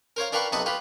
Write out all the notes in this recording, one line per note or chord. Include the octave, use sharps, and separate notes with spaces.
A#4 C5 C#5 F5
D4 A#4 B4 F5 G5 C#6
B1 C3 B4 A5 C#6 D#6
F4 G4 B4